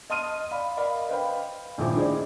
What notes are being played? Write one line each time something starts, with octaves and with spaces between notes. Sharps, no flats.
D#5 A5 C6 D#6 F6 D#7
D5 F5 B5
A#4 D5 D#5 F5 B5
B4 C5 D#5 F5 G5 B5
D#1 A#1 A3 E4 C5 D6
D#4 E4 G#4 C5 D5 D#5